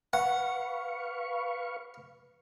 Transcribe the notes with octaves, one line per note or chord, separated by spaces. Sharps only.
B4 F5 F#5 C#6